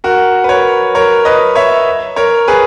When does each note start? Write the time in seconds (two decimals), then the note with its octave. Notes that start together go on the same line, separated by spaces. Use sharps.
0.04 F#4 A#4
0.44 B4
0.49 A#4 C#5
0.95 A#4 C#5
1.25 B4 D#5
1.55 C#5 E5
2.16 A#4 C#5
2.48 G#4 B4